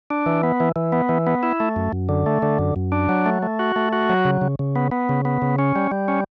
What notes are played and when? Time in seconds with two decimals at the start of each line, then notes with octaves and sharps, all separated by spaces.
0.10 D4
0.26 E3
0.43 B3
0.60 E3
0.76 E3
0.92 B3
1.09 E3
1.27 B3
1.43 E4
1.60 A3
1.76 F#2
1.93 F#2
2.09 D3
2.26 A3
2.42 D3
2.59 F#2
2.76 F#2
2.92 D4
3.09 F#3
3.26 A3
3.42 A3
3.59 F#4
3.76 A3
3.93 F#4
4.09 F#3
4.25 C#3
4.41 C#3
4.59 C#3
4.76 B3
4.91 B3
5.09 C#3
5.25 B3
5.42 C#3
5.59 C#4
5.75 G3
5.91 G3
6.08 C#4